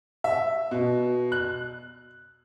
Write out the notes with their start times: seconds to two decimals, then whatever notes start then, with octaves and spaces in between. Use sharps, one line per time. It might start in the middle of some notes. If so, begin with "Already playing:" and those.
0.24 E5
0.71 B2
1.32 F#6